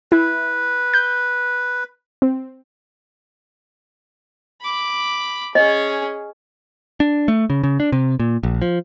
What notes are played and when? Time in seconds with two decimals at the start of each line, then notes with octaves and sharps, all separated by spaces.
0.12 E4 B4
0.94 G6
2.22 C4
4.62 B5 D6
5.55 C#4 G#4 D#5
7.00 D4
7.28 A3
7.50 C#3
7.63 C#3
7.80 D4
7.92 C3
8.20 A#2
8.43 A#1
8.62 F3